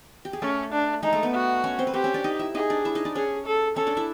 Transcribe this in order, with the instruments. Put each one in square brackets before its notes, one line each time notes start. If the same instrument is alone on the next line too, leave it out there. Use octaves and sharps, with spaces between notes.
[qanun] G4
G#4
[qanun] A3 A4 [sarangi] C#4
[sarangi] D4
[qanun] G#3 G#4 [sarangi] D#4
[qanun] A3 A4
B3 B4
[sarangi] F#4
[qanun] C#4 C#5
C4 C5
B4
[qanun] C4 C5 [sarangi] G4
[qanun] C#4 C#5
D4 D5
D#4 D#5
E4 E5
[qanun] D#4 D#5 [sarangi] G#4
[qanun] D4 D5
E4 E5
D#4 D#5
D4 D5
[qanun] C#4 C#5 [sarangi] G#4
[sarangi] A4
[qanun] C#4 C#5 [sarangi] A4
[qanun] D4 D5
E4 E5